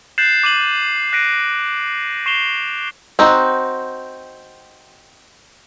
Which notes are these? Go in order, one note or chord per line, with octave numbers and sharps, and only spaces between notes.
F#6 G6 A6 C7 E7 F#7
D6 D#7 F#7
F#6 A#6 B6 D7 D#7
C#6 C7 E7 F7 G7
C4 D#4 F#4